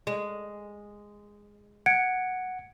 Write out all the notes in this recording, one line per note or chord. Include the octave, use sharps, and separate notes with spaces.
G#3
F#5 G#6 C#7 D7